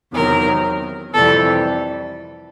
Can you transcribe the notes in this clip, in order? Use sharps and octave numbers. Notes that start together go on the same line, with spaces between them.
E2 C3 D#3 F#3 A#4
F2 C3 E3 G3 A4